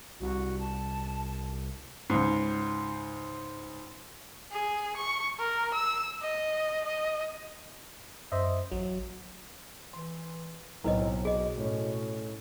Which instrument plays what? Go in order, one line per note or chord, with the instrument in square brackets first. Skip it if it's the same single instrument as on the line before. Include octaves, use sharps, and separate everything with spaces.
[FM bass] C2 [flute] F#4
[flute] A5
[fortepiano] C#2 G#2
[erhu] G#4
C#6
A#4
E6
D#5
D#5
[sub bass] F#2 [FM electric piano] C5 D#5 E5
[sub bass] A1 [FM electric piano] F#3
[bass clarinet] E3 [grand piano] C6
[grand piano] B1 C4 [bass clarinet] A2 [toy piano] E4 B4 D#5
[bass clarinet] B2 [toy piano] G#4 D#5
[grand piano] A2 C#4